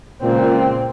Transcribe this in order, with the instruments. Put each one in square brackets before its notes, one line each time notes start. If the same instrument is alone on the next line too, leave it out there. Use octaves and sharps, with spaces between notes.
[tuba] C#2 [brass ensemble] A#2 [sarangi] C4